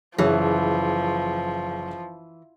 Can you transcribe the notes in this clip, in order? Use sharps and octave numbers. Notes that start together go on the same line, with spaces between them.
F#1 E3 F3 G#4 C#5